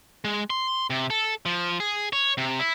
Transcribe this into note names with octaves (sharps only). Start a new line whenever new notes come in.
G#3
C6
C3
A4
F3
G#4
C#5
C3
E4